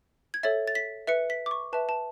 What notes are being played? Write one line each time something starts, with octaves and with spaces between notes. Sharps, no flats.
G#6
A4 C#5 E5 A6
A6
B6
B4 E5 C#7
B6
D6
C#6
B4 E5 A5
A5